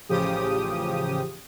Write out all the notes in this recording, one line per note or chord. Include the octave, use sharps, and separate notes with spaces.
A1 C#3 F3 G4 D#6